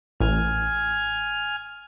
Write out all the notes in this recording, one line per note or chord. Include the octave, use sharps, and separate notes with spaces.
A1 G#5 F6